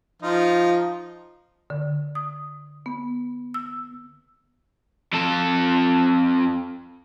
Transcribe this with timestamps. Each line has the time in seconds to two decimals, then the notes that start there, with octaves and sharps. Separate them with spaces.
0.22 F3 D#4 F4
1.70 D3
2.15 D#6
2.86 B3
3.54 E6
5.13 F2 A4